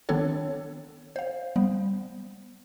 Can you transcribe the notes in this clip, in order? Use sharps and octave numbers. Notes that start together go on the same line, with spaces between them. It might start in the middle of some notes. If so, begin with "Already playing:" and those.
D#3 B3 C4 D4 A4 C#5
C5 F5
G3 B3